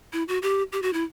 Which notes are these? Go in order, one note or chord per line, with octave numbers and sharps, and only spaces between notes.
E4
F#4
G4
G4
F#4
E4